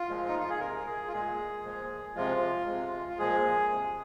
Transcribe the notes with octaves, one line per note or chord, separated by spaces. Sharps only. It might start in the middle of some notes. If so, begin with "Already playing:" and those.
Already playing: F4
A#2 F3 G#3
D#4
F4
G#4
C3 G#3 A#4
G#4
F4
A#2 G#3 G#4
A#2 F3 G#3
C3 F3 G#3 F4
C3 G#3
F4
A#2 F3 G#3 G#4
C3 G#3